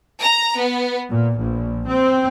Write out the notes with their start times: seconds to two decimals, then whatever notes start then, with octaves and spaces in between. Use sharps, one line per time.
0.21 A#5
0.58 B3
1.09 A#2
1.38 A#1
1.87 C4